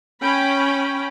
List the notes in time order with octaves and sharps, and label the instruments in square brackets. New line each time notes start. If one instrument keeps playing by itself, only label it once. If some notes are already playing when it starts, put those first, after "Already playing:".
[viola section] C#4 G5 B5